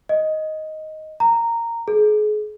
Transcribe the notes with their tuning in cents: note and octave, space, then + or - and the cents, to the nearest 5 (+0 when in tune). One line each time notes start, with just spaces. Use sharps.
D#5 +5
A#5 -10
G#4 +35